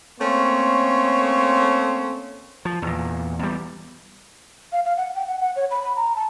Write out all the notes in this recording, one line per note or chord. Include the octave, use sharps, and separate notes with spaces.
A3 A#3 C4 C#4 C#5 C6
F3
E2 A#2
E2 G3
F5
F5
F#5
G5
F#5
F#5
C#5
B5
B5
A#5
A5